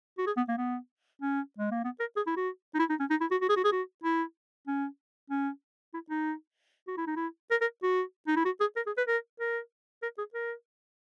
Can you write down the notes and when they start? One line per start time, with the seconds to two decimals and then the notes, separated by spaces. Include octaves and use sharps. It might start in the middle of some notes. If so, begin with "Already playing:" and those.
0.18 F#4
0.27 G#4
0.37 B3
0.48 A#3
0.58 B3
1.22 C#4
1.58 G#3
1.71 A#3
1.84 B3
2.00 A#4
2.16 G#4
2.27 E4
2.37 F#4
2.74 D#4
2.79 E4
2.90 D#4
3.00 C#4
3.10 D#4
3.21 E4
3.31 F#4
3.41 F#4
3.49 G#4
3.57 F#4
3.64 G#4
3.72 F#4
4.04 E4
4.67 C#4
5.30 C#4
5.94 E4
6.10 D#4
6.88 F#4
6.98 E4
7.07 D#4
7.16 E4
7.51 A#4
7.61 A#4
7.83 F#4
8.27 D#4
8.36 E4
8.45 F#4
8.60 G#4
8.76 A#4
8.87 G#4
8.97 B4
9.08 A#4
9.40 A#4
10.02 A#4
10.18 G#4
10.34 A#4